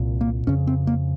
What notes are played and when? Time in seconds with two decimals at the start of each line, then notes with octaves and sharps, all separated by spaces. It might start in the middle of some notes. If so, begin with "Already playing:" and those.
Already playing: C2 A#2
0.21 A#3
0.47 F2 C#3 C#4
0.67 C4
0.87 A#3